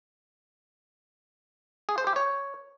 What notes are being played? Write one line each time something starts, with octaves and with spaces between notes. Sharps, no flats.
G#4
C5
G4
C#5